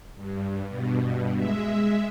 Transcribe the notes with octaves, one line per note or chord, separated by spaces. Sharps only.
G2
G2 B2
G#3 E5